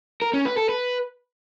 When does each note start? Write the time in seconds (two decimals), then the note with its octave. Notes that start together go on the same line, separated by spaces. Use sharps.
0.22 A#4
0.33 C#4
0.45 B4
0.57 A4
0.69 B4